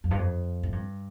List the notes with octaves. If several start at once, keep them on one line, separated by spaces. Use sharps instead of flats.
F2
G2
F2
A2
G2